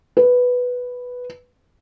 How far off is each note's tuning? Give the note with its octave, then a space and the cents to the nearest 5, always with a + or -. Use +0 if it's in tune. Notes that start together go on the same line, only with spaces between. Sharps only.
B4 +0